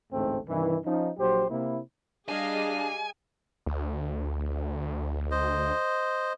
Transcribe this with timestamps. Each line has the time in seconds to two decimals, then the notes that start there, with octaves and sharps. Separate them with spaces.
0.11 A1 D2 G#2 A3 C4
0.47 G2 C3 D#3 E3
0.85 F3 C#4 D#4
1.18 A#1 F#3 G4 C5
1.50 C3 A#3 E4
2.29 G3 D4 G#4 D#5 F5 G#5
3.66 D2
5.31 C5 D#5